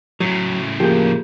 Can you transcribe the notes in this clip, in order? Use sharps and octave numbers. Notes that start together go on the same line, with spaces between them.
A2 C#3 F#3
F3 A#3 G4 G#4 G6